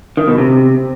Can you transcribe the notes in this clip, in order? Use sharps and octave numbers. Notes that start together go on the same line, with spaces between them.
D#3
B2
C3